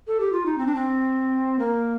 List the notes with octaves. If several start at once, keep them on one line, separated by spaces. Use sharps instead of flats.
A4
G4
F4
D#4
C4
D4
C4
A#3